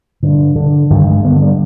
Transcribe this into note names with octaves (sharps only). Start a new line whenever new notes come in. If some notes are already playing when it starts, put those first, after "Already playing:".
G2 D3
D3
G2 D#3
G#3
D3 B3
G3